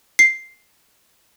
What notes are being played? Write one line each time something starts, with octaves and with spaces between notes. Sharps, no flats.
C7